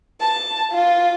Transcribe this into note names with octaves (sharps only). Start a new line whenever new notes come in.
A5
F4